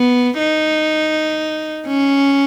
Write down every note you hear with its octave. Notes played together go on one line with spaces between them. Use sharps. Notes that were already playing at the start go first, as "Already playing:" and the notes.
Already playing: B3
D#4
C#4